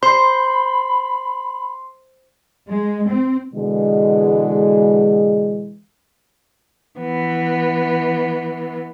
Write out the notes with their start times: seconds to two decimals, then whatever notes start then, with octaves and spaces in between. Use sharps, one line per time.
0.03 C5 B5 C6
2.66 G#3
3.08 C4
3.54 B2 D3 E3 G#3
6.99 E3 B3